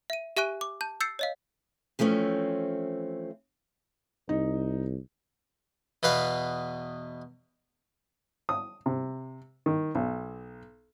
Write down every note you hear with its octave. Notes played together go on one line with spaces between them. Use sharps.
E5 D#7
G4 E5 G#5 C#6 F#6 D#7
D6
A5 G6
E6 G6 A6 C7 C#7
C#5 D#5 F5
E3 F3 A3 C4 C#4
C2 D#4
E2 B2 B4 F5
D#6
C3
D#3
B1